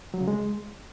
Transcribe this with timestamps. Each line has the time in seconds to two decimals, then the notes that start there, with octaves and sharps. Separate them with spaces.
0.14 F#3
0.21 C#3
0.28 G#3